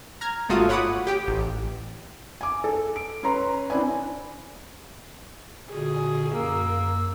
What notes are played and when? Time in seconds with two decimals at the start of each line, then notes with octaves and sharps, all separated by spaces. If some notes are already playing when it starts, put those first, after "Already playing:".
0.21 A#5 F6 G#6
0.49 G1 G#2 A3 F4 F#4 D#6
0.69 C#5 F#5 B5 D6 D#6
1.07 G4 G5
1.28 A1
2.41 G#5 D6
2.64 A4
2.96 D7
3.23 C#4 B4 C#5 A#5 C6
3.70 C4 D4 E4 D5 G#5
5.73 A#2 D3 F#4 G#4
6.35 F#2 A#3 E6